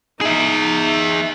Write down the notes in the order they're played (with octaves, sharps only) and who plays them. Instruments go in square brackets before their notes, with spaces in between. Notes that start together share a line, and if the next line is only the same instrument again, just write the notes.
[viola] D#4 [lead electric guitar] G#4 E5